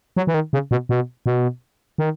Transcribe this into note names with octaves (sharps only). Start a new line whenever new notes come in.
F#3
E3
D#3
C#3
B2
B2
B2
D#3